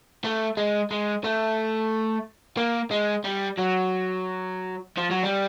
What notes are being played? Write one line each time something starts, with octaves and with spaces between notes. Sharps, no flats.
A3
G#3
G#3
A3
A#3
G#3
G3
F#3
F3
F#3
G3